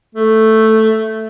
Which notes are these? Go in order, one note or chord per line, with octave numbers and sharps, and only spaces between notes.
A3